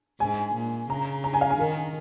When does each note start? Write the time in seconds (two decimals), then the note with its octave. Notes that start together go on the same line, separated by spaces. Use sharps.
0.20 G#2 G#5
0.55 A#2
0.90 C#3 A#5
1.24 A#5
1.34 G#5
1.41 F5
1.51 G#5
1.59 D#3 A#4